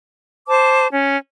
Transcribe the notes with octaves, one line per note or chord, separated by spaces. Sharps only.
C5 A5 D6
C#4